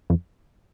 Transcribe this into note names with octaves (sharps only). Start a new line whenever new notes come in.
F2